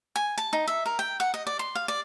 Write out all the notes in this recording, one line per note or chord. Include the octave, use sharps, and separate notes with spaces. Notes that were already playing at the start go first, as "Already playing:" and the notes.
G#5
A5
D#4
E5
A#4
G5
F#5
D#5
D5
C6
F5
D5